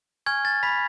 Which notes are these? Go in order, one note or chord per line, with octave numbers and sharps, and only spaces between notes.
G#5 C#6 F6 G#6
A6
B5 B6